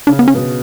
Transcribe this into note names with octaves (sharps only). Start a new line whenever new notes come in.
C#3 D4
B3
C#4
B2